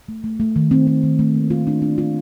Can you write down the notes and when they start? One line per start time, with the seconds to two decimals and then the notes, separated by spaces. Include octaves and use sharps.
0.09 A3
0.24 A3
0.40 A3
0.56 D#3
0.71 C4
0.87 C4
1.03 D#3
1.19 A3
1.35 A#3
1.50 F4
1.67 D4
1.82 D4
1.98 F4